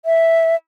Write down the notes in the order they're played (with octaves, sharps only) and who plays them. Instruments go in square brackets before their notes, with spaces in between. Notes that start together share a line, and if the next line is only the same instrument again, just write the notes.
[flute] E5